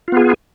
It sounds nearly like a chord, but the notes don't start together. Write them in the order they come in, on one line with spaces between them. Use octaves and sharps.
F4 B3 G#4